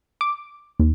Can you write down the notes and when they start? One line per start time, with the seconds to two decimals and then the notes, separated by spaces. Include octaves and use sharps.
0.21 D6
0.80 D#2